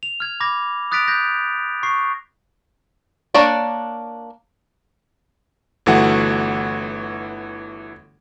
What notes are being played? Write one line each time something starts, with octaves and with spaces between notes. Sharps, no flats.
F7
F6 G#6
B5 D6 G#6 A#6
D#6 F#6 A6 B6 D7 F7
F#6 G6 A#6
C#6 C7
A#3 D4 C#5 D5
G1 E3 A3 F#4 F#5